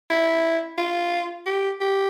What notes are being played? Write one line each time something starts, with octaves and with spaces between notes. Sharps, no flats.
E4
F4
G4
G4